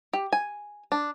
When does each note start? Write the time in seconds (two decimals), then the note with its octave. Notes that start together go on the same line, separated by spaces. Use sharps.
0.13 G4
0.33 G#5
0.92 D4